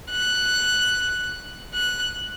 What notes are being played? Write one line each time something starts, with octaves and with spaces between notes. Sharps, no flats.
F#6
F#6